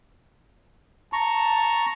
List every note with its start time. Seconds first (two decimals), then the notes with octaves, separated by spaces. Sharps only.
1.13 A5 A#5 C#6